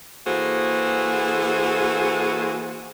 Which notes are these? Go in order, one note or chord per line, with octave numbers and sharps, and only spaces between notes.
E3 A#3 F#4 G#4 A4 C5